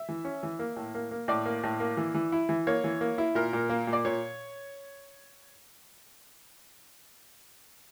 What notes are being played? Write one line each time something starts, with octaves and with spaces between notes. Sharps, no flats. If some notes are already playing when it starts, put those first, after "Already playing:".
Already playing: E5
E3
C#4
E3
A#3
A2
A#3
A#3
A2 D5
A#3
A2
A#3
E3
E3
E4
E3
A#3 C#5
E3
A#3
E4
A#2 A#4
A#2
A#3
A#2
D5
A#2 C#5